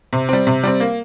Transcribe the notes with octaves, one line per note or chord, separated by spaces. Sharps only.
C3
G3 C4
C3
G3 C4
A#3